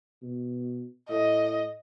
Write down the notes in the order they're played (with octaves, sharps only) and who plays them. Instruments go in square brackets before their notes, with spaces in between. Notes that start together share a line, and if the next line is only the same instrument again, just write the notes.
[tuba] B2
[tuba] A2 [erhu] D#5